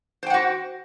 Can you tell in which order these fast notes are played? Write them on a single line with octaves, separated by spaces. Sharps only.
C5 G5 F#5 F#4